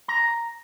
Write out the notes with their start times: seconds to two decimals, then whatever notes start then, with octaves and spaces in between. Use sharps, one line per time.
0.08 A#5